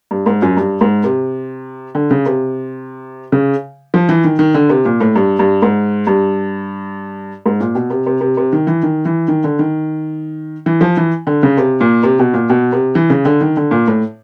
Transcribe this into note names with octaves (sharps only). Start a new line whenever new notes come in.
G2
G#2
F#2
G2
G#2
C3
D3
C#3
C3
C#3
F3
E3
D#3
D#3
D3
C3
A#2
A2
G2
G2
G#2
G2
G#2
A#2
B2
C3
C3
C3
C3
D#3
E3
D#3
E3
D#3
D3
D#3
E3
F3
E3
D3
C#3
C3
A#2
C3
B2
A#2
B2
C3
E3
C#3
D3
D#3
D3
A#2
A2